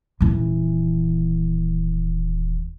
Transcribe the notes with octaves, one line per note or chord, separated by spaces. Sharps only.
D#1 E3